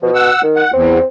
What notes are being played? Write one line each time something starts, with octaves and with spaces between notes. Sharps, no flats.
B2 F3
F#5 E6
D#3
F#5
E2 C4